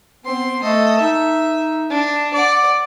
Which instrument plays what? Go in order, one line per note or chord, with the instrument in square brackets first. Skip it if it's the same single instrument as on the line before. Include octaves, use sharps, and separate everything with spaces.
[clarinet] B3 [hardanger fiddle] C4 C6
[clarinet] A3 [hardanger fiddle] A4 D#5
[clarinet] D#4 [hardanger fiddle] E5
[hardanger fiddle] D4
[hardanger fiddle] D5 F#5 [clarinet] D6